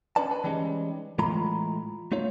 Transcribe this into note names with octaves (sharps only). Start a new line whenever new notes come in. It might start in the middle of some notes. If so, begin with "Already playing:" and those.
C#4 D4 B4 D5 A5
B4
E3 G3 G#3 C#4 D#4
A2 E3 G#3 F4 A#5 B5
A3 D#4 F4 C#5